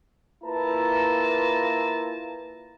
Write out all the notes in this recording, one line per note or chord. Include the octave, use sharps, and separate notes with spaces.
A#3 E4 F4 B4 A5 A#5